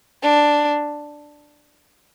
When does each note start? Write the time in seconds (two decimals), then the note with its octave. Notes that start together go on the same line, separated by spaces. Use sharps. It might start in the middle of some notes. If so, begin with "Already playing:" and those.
0.22 D4